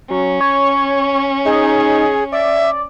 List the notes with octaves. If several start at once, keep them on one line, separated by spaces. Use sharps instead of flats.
F#3 C#4
C#5
D#4 G#4
D5 E5